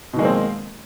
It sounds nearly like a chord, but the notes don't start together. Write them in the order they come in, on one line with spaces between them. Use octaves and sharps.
B2 D#3 G#3 A#3 C4